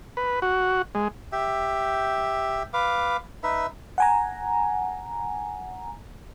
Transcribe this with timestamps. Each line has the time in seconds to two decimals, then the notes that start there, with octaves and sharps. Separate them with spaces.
0.17 B4
0.42 F#4
0.95 G#3
1.32 G4 E5
2.73 B4 F5 D6
3.43 D#4 B4 E5
3.98 F#5 G#5 A#5